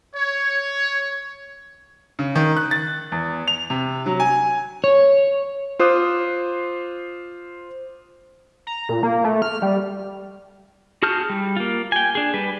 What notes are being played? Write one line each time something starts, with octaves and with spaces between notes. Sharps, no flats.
C#5
C#3
D#3
F#6
A6
E2
F7
C3
F#3
G#5
C#5
F4 C5 D6 D#6 F#6
A#5
A#2
A#3
A3
F6
G3
F#4 G#4 A5 F6 G6
G3
A#3 F4
G5 G#5
D4 G#4
G3 B4